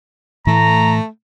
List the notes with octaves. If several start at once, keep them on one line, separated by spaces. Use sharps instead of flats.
A2 E3 A3 A#5